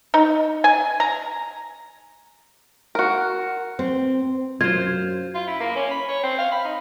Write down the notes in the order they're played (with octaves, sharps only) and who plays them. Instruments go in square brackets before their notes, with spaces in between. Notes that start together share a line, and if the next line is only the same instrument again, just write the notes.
[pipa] D#4
G#5
A#5
[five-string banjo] F#4 A#4
[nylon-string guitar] C4
[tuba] F#2 [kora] F4 C5 [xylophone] G#6
[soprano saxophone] F4
E4
A#3
C#4
B5
C#5
C4
F5
B5
D#4